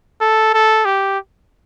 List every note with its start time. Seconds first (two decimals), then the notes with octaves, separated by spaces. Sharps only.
0.21 A4
0.53 A4
0.85 G4